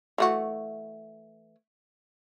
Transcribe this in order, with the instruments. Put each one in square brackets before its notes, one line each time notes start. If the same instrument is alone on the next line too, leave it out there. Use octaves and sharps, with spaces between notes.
[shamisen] E3 A3 F#4